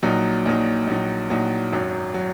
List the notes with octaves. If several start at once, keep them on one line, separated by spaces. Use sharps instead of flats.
A#1 A#2 F#3 D#4
A#1 A#2 F#3 D#4
A#1 A#2 F#3 D#4
A#1 A#2 F#3 D#4
G#1 F#2 F#3
F#3